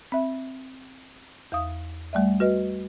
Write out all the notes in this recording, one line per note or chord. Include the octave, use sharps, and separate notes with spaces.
C4 E5
E2 F5 D#6
G3 A3 D5 E5
F#4 B4 D#5